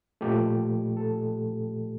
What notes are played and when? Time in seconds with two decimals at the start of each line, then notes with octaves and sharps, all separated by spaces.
0.21 A#2 F3 A3 G4
0.97 A4